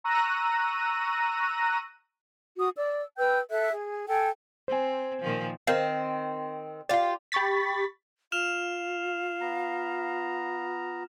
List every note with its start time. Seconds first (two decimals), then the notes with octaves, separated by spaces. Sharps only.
0.04 A#5 C#6 E6 F#6 A#6 D#7
2.58 F#4 D#6
2.75 D5 E6
3.18 B4 G5 E6 G6
3.51 A4 E5 F#6
3.71 G#4
4.07 A4 G5 G#5
4.68 C4 C5 G#5
5.22 A#2 D#3 F3
5.67 D#3 C4 A#4 C5 F5
6.89 F4 G4 D5 F5
7.32 G4 B5 C#6 A6 B6
8.32 F4 F5 F6 E7 F7
9.41 B3 A#5